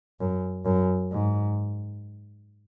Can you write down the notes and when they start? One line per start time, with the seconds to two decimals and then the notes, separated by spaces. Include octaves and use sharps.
0.20 F#2
0.65 F#2
1.12 G#2